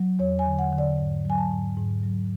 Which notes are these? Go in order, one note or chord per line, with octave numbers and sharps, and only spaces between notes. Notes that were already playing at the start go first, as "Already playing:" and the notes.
Already playing: F#3
E2 C#5
G#5
D3
F#5
D3
D5
G#2
F#3 G#5
A5
G#2
G#2
F#3